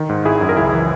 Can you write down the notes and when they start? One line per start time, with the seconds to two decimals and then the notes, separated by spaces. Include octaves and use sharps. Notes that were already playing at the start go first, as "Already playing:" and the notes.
Already playing: D#3
0.09 G#2
0.25 G#1 E4 G#4
0.41 F#2
0.49 A#4
0.57 C#2 E4 G#4
0.73 E3